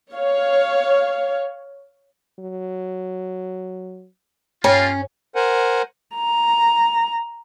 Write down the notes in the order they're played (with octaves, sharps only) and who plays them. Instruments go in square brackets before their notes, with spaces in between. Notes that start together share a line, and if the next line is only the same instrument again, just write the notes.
[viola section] C#5 F5
[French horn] F#3
[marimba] G2 C#5 G5 [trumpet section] A#3 F4 [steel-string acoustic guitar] C#4
[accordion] A#4 C5 F#5 G#5
[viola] A#5